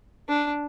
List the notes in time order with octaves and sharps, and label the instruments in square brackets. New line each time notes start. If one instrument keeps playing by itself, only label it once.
[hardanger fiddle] D4